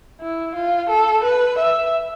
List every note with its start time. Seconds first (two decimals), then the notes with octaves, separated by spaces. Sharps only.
0.21 E4
0.55 F4
0.89 A4
1.23 B4
1.58 E5